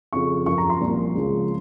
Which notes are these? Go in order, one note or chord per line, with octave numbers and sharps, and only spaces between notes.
F2 C#3 F3 C#6
F#2 F3 C#6
A#5
C6
C2 A#2 F3
C#2 C#3 F3